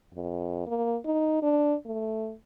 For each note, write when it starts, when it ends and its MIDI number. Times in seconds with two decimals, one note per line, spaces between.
0.15 0.64 41
0.67 0.97 58
1.05 1.42 63
1.42 1.75 62
1.86 2.33 57